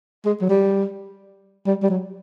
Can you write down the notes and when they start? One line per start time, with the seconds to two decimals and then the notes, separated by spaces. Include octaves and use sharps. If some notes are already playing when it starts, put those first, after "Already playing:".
0.25 G#3
0.41 F#3
0.49 G3
1.66 G3
1.83 G3
1.90 F#3